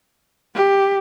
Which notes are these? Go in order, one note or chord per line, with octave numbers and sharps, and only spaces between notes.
G4